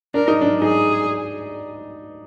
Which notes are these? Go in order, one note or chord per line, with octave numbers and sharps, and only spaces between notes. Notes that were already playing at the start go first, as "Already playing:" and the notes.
D4 A#4
D#4
D4
D#4 G#4